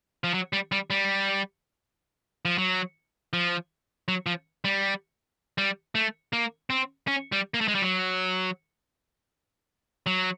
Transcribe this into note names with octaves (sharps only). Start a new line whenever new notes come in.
F3
F#3
G3
G3
G3
F3
F#3
F3
F#3
F3
G3
G3
A3
A#3
C4
C#4
G3
A#3
A3
G#3
G3
F#3
F#3